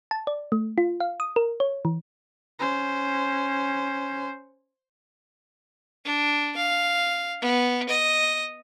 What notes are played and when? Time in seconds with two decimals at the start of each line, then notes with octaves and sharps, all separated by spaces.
0.11 A5
0.27 D5
0.52 A3
0.78 F4
1.00 F5
1.20 D#6
1.36 A#4
1.60 C#5
1.85 E3
2.59 C#4 C5
6.05 D4
6.56 F5
7.41 B3
7.89 D#5